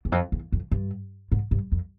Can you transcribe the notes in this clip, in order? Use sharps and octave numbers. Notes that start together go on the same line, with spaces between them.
E2
F2
E2
F2
G2
G#2
G2
F2